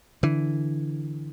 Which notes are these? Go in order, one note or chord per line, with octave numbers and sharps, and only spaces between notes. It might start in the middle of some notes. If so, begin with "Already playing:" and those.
D3 E3